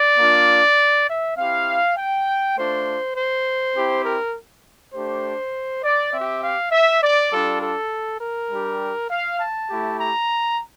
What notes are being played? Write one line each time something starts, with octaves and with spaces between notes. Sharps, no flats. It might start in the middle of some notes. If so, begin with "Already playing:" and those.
Already playing: D5
A#3 D4 F4
E5
C4 E4 G4 F5
G5
A3 D4 F4 C5
C5
C4 E4 G4
A#4
A3 D4 G4 C5
D5
C4 G4 E5
F5
E5
D5
G3 D4 F4 A4
A4
A#4
G3 D4 G4
F5
A5
A3 E4 G4
A#5